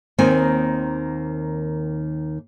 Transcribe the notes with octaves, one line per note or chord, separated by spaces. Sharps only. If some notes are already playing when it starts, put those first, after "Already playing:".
D#2 D#3 A#3 C4 G#5